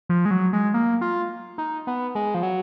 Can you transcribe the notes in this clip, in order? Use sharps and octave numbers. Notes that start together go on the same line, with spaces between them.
F3
G#3
F#3
G#3
A#3
F4
D#4
B3
G#3
F3
F#3